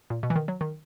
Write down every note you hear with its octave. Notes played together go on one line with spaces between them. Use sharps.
A#2
B2
E3
D#3
F#3
D#3